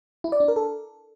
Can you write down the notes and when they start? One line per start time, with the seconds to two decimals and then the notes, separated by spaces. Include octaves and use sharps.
0.24 E4
0.32 D5
0.40 D4
0.48 A#4
0.56 A4